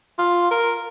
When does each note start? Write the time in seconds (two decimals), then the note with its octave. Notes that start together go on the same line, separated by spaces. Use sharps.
0.18 F4
0.51 A#4